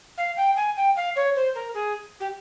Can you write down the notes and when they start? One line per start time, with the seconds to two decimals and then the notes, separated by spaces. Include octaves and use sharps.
0.18 F5
0.37 G5
0.56 G#5
0.77 G5
0.96 F5
1.16 C#5
1.36 C5
1.55 A#4
1.74 G#4
2.20 G4